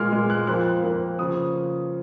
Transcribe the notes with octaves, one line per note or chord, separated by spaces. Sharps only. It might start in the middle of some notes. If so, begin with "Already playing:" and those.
Already playing: A#2 G#3 F6
A#2 G#3
F#6
F2 F3 A#3 F#6
F2 F3 A#3
C#3 F3 A#3 D#6